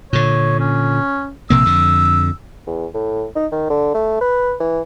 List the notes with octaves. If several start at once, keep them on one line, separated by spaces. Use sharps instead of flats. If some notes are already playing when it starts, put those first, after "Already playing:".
A#2 D3 C#5
C#4
A#1 C3 A#3 E6
F2 D3
E2
A2
D#4
D#3
D3
A3
B4
E3